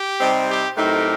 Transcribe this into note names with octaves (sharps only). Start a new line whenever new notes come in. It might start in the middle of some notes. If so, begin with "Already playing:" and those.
Already playing: G4
C3 G3 C4 D#4
G4
A2 F#3 A3 C4 D#4 G4 A#4